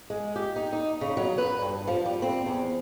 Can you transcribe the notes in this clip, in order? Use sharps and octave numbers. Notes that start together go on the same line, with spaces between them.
G#3
G4
D#4
D#4
C#3
F#3
B4
G2
F3
G3
C4
E2